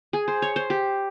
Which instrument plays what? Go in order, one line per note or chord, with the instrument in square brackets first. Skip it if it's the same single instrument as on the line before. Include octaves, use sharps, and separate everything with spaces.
[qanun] G#4
C5
C#5
C5
G4